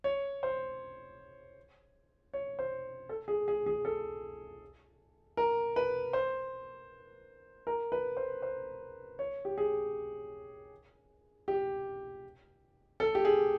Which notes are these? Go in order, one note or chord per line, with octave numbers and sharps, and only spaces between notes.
C#5
C5
C#5
C5
A4
G#4
G#4
G#4
A4
A#4
B4
C5
A#4
B4
C5
C5
C#5
G4
G#4
G4
A4
G4
G#4